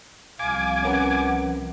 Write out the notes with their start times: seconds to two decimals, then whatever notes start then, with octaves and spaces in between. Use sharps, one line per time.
0.39 C2 C3 F3 F5 G#5 D6
0.83 C#4 A#4 B4 F#5